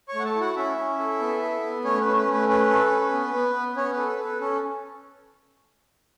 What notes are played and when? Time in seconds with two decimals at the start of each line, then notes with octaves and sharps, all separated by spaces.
0.08 C#5 C#6
0.14 A3
0.19 F#5
0.25 A4 A5
0.35 E4
0.41 F#4 F#5
0.56 C#4 E4 E5
0.77 C#4
0.99 A4
1.20 B3
1.42 A4
1.63 B3
1.84 A3 C#4 C#5
2.01 C#4 B4
2.17 B4
2.27 A3
2.33 B4
2.49 C#4 B4
2.70 A4
2.91 C#4
3.12 B3
3.34 B3
3.55 B3
3.76 B3 C#4 C#5
3.92 B4
3.97 A4
4.09 B4
4.19 A4
4.24 B4
4.40 C#4 A4